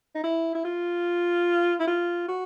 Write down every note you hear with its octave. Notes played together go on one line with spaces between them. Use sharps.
D#4
E4
E4
F4
E4
F4
F#4